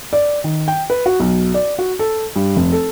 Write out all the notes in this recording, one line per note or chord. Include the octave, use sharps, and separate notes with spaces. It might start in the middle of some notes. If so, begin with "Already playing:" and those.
D5
D#3
G5
B4
F#4
B1
D5
F#4
A4
G2
F1
A4